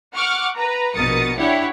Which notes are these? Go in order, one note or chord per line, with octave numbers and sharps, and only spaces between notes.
F#5 C#6 D6 F6
B4 A#5
A#1 B2 A#4 D#6 A6 C#7
D4 E4 G4 C#5 F#5